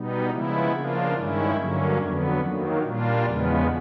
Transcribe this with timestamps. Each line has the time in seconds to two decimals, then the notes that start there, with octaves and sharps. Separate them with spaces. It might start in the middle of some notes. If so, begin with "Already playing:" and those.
Already playing: B2 G3 B3 D#4
0.30 C#3 F3 G#3 B3 E4
0.72 C#3 F3 A#3 D4 F4
1.14 G2 D#3 G#3 C#4 E4
1.56 G2 D3 F#3 A#3 C#4
1.99 F2 D3 F#3 B3
2.41 D#3 F#3 A#3
2.82 A#2 G3 A#3 D4 F4
3.25 E2 C#3 F3 G#3 B3